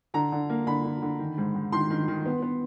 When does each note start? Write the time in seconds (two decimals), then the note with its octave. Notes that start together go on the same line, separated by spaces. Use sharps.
0.14 D3 A#5
0.32 D3
0.49 A#3
0.67 D3 B5
0.84 D3
1.02 D3
1.19 D#3
1.38 G#2
1.55 G#2
1.72 D#3 C6
1.90 D#3
2.08 D#3
2.26 B3
2.42 B3